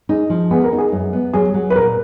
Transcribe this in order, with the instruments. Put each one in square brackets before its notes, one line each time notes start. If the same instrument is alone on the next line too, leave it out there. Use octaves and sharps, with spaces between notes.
[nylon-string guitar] D#4 [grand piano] G#4
[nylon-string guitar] F3
[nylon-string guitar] B3 [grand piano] G#4
[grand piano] A#4
[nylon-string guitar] D#4
[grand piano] G#4
[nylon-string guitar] F#2
B3
[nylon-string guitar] F#3 [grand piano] G#4
[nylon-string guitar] F#3
[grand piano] B4
[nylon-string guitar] A#2 [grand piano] A#4